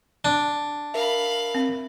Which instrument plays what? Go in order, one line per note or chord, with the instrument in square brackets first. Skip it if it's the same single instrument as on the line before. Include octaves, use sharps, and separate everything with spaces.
[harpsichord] D4
[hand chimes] A#4 E5 [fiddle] F5 B5
[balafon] C4